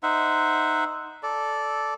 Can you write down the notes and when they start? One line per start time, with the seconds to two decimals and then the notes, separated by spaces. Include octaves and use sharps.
0.03 D#4 C5 E5 F#5
1.23 A4 D5